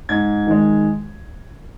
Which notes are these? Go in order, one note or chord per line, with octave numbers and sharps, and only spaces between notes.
G#2 G#6
D#3 G#3